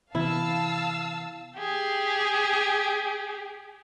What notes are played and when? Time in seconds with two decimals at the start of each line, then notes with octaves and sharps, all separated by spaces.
0.15 C3 E3 B3 E4 F5 A5 E6
1.57 G4 G#4